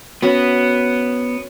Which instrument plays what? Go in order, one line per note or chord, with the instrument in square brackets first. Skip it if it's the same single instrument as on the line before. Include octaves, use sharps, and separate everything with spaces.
[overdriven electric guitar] B3 [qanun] C#4 F#4